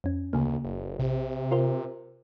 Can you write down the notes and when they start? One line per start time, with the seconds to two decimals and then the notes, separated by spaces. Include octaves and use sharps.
0.04 F2 C#4
0.33 D2 C#3 A#3
0.64 F#1
0.99 A#1 C3
1.51 F4 A#4 C5